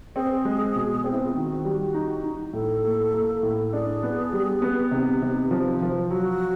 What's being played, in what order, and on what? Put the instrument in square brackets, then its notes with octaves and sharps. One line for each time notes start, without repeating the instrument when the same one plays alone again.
[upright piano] C4 [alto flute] G#4
[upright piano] G#3
B2
C4
[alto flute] E4
F4
[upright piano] D#3 [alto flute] F#4
[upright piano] G3
D#4
D#4
[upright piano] A2 [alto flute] A4
[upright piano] A#3
A#3
A2
[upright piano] D4 [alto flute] G#4
[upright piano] B3
G3
B3
[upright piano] C3 [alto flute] D#4
[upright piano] C3
F3
F3
[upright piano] F#3 [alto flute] F#4